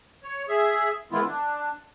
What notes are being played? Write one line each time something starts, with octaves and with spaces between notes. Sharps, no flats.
C#5
G#4 E5
D#3 E3 G#3 B3 E4 F4
D4